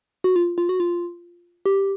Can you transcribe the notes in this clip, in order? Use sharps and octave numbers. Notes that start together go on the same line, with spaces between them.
F#4
F4
F4
F#4
F4
G4